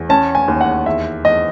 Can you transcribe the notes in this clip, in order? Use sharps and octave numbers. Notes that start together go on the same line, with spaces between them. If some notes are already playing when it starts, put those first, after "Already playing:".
Already playing: E2
C#4 A5
G#5
D#2
F#5
E2 E5
E2 D#5